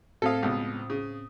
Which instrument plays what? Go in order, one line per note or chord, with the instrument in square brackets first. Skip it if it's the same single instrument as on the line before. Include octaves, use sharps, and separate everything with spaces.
[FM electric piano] A2 C4 D#6 [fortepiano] A4 F5
[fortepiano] C#2 B2
C#3